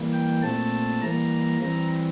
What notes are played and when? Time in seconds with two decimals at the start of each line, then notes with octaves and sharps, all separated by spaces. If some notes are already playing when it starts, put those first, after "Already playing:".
Already playing: E3 G3 A#3
0.13 G5
0.42 A#2 A3 C4 A5
1.01 E3 G3 A#3 A#5
1.61 E3 G3 C4 A#5